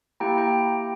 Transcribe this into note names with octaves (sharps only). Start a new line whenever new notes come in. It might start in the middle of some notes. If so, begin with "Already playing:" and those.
A#3 E4 G4 G5 A#5
G5 A#5